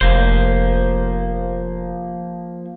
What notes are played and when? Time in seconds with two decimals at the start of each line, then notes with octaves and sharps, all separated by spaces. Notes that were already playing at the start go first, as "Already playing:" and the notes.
0.01 F1 F3 A#3 C5